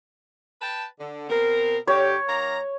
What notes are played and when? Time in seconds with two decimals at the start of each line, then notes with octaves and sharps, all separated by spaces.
0.62 B4 G5 A5
0.99 D3
1.29 B2 C4 A#4
1.87 G2 D3 G4 C#5
2.28 D#3 A#3 A#5